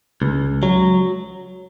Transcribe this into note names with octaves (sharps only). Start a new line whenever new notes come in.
C#2
F#3